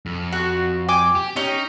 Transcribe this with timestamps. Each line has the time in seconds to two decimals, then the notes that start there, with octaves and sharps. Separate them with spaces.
0.06 F2
0.32 F#4
0.89 G5 G#5 D6
1.15 G4
1.36 C#4 D#4 G4